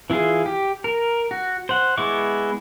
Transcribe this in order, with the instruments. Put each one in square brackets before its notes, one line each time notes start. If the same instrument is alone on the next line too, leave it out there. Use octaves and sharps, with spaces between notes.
[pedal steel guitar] E3 E4 F4 G#4
G4
A#4
F#4
C5 F#5
G#3 B3 E4 C#6 D6